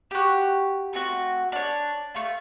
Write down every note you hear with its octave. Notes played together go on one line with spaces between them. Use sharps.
F#4 G4
A3 C4 F#4
D4 C#5
A3 F4